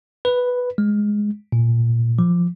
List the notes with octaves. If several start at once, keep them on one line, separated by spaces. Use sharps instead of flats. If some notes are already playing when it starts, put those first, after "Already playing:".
B4
G#3
A#2
F3